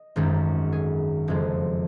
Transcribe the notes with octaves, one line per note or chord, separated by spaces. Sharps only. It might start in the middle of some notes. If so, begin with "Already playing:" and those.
Already playing: D#5
G#1 F#2 D#3 G#3
G#4
F#1 F2 F3 G#3